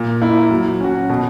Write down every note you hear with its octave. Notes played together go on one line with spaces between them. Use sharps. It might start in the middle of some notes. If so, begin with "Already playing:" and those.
Already playing: A#2
A#3 E4
F#3
C#4 F#4
B2